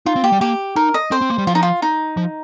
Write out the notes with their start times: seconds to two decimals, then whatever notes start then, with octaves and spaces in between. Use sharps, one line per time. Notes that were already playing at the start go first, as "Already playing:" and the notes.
0.06 D#4 F4
0.16 C4
0.23 A#3 G4
0.32 G3
0.41 A#3 G4
0.76 D#4 A#4
0.94 D#5
1.11 C4 C5
1.21 C4
1.30 A#3
1.38 G3
1.47 F3 F4
1.55 D#4
1.63 F4
1.82 D#4
2.17 F3